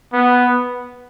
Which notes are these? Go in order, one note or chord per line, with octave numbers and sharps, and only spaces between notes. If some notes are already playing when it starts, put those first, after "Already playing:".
B3